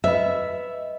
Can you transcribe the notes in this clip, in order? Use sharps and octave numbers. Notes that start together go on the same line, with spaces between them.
B4 D#5 E5 B5